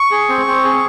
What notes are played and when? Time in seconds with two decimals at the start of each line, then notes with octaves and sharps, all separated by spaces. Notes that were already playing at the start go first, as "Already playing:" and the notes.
Already playing: C#6
0.11 G#4
0.29 C4
0.47 C4
0.64 G#4